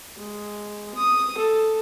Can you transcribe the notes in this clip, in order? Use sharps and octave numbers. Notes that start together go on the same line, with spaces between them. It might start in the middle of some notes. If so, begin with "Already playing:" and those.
G#3
D#6
A4